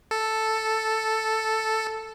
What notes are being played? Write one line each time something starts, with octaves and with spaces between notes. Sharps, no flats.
A4